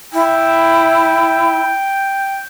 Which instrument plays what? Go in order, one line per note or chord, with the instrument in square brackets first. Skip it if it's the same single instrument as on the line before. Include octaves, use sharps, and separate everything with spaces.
[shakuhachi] E4 [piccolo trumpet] G5